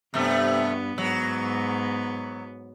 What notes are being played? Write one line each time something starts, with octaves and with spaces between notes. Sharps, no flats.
G2 C3 A3 B3
G#2 F#3 B3